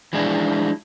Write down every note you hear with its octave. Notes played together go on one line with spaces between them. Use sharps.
E3 F3 G#3 D4 E4